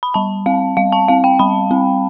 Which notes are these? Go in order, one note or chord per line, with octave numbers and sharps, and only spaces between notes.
B5
G3 A5
C4 F5
G3 F5
A5
C4 F5
G5
G3 B5
C4